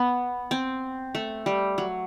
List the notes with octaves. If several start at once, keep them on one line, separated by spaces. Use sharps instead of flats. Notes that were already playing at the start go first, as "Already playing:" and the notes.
Already playing: B3
C4
A3
G3
F#3